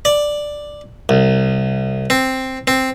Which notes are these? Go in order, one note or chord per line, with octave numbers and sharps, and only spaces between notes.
D5
C2
C4
C4